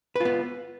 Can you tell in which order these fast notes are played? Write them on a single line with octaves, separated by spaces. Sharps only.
B4 F4 B3